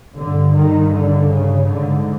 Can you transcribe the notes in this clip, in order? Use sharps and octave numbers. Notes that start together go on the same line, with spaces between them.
G2 D3
D#3
D3
C#3
G#2 D3